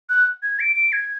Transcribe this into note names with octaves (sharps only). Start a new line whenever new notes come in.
F#6
G#6
D7
D7
G#6